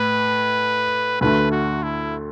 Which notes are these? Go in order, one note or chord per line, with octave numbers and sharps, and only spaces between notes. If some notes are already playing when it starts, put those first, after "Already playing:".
Already playing: A2 A3 B4
D2 D3 A3 B4
F#4
E4